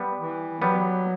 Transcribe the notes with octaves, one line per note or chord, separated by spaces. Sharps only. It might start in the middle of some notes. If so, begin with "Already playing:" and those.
Already playing: G3 B3
E3
F#3 G3 B3